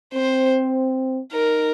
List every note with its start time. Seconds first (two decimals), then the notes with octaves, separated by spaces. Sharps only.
0.14 C4 C5
1.32 D#4 A#4